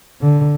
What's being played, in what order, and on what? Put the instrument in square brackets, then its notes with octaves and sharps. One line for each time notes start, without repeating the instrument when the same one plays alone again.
[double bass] D3